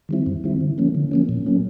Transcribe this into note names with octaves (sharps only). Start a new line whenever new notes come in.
D#3 G3 C4 E4
F#2
D#3 G3 C4 E4
D3
F3 A#3 C#4
D3
F3 A#3 C#4
A#2
F#3 A#3 C#4